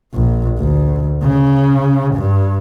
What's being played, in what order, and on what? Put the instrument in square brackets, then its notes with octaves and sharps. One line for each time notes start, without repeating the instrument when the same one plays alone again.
[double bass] A#1
D2
C#3
G2